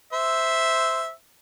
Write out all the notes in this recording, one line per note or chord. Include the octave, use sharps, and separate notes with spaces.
C5 E5